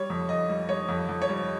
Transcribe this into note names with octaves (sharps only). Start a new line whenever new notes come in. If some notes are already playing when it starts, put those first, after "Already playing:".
Already playing: G3 C#5
F2
F2 D#5
G3
G3 C#5
F2
F2
C#5
G3